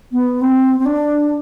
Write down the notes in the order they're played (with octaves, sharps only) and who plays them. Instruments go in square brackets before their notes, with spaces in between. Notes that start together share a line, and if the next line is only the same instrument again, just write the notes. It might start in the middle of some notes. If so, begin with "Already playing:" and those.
[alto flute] B3
C4
C4
D4